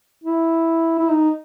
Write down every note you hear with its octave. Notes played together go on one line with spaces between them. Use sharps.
E4
E4
D#4